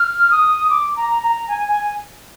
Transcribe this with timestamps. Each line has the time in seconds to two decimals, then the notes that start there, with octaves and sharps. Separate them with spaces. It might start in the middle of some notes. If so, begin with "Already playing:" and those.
Already playing: F6
0.31 D#6
0.69 D6
0.96 A#5
1.22 A#5
1.48 G#5
1.68 G#5